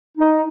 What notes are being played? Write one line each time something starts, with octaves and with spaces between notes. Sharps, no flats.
D#4